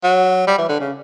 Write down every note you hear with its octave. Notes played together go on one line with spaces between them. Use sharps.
F#3
G3
E3
D3
C#3